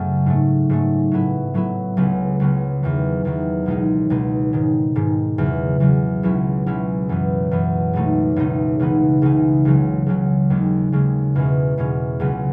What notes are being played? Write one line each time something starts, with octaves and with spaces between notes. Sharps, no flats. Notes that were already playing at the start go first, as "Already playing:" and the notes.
Already playing: F#2 C#3 F#3 A3
G#2 F#3 A3
G#2 F#3 A3
A2 F#3 B3 E4
A2 F#3 B3 E4
C#2 C#3 F#3 B3
C#2 C#3 F#3 B3
E2 D#3 F#3
E2 D#3 F#3
C#2 B2 G#3 D#4
C#2 B2 G#3 D#4
G#2 D#3 G#3
G#2 D#3 G#3
E2 C#3 F#3
E2 C#3 F#3
C#2 B2 F#3 C#4 E4
C#2 B2 F#3 C#4 E4
F#2 E3 B3
F#2 E3 B3
C#2 B2 A3 D#4
C#2 B2 A3 D#4
C#2 C#3 E3 B3 D#4
C#2 C#3 E3 B3 D#4
C#2 C#3 F#3
C#2 C#3 F#3
D#2 C#3 G#3
D#2 C#3 G#3
E2 B2 G#3 C#4
E2 B2 G#3 C#4
C#2 C#3 F#3 B3